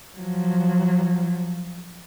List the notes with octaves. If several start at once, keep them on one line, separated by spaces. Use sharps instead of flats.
F3 F#3